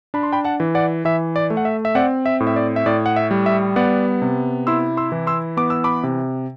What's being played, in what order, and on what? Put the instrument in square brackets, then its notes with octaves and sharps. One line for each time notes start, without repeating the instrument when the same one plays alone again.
[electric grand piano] D4 B5
C6
G5 B5
F#5 A5
E3
D5 F#5
E3 E5
D5
A3
F#5
E5
E5
C4 D5 F#5
E5
A2
E5
D5
E5
A2 D5
F#5
E5
G3
E5
B3 D5 F#5
C3
E4 C6 E6
C6 E6
E3
C6 E6
B3 D6
E6
B5 D6
C3